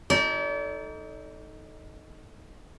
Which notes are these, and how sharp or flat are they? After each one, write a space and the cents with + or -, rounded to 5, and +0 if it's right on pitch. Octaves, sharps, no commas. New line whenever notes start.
D#4 +10 A4 +0 D5 -40